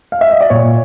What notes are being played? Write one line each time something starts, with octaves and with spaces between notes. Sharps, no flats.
F5
E5
D#5
D5
A#2 C#5